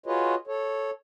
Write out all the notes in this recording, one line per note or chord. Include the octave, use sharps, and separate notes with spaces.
F4 F#4 G#4 B4 C#5 D#5
A4 C#5